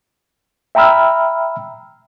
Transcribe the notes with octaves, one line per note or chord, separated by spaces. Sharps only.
E5 G5 A#5 B5 E6 F6